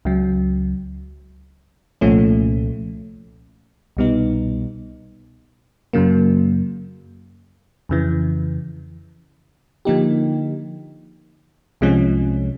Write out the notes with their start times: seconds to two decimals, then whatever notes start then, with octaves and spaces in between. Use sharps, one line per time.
0.05 C#2 C#3 F#3
2.01 C2 A#2 F3 A3 C#4
3.97 C2 B2 G3 B3 D#4
5.93 F#2 C#3 F#3 A#3
7.89 F2 C#3 E3
9.85 D3 F3 A#3 D#4 G4
11.81 C2 C3 F3 G#3 C#4